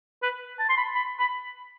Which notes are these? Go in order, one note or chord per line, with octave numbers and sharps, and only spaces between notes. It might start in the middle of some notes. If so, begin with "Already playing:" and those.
B4
A5
C6
B5
B5
B5